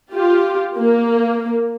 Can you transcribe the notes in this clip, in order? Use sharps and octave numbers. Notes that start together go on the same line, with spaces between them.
F4 G4
A#3